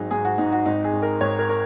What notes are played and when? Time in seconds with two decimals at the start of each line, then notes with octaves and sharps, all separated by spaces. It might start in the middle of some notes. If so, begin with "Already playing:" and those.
Already playing: G#1 F#3 D#4 G#4
0.11 G#2 G#4
0.25 F#4
0.38 G#2 D#4
0.52 F#4
0.66 G#1 D#4
0.84 G#4
0.93 G#1
1.02 A#4
1.21 G#1 C#5
1.39 A#4
1.49 A#4